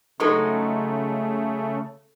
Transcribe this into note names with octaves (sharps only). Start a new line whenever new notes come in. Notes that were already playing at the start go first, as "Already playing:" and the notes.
C#3 F#3 G#3 A3 D#4 A4 C#6